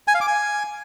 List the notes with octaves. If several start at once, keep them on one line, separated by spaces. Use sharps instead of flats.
G#5
F5
D6
G#5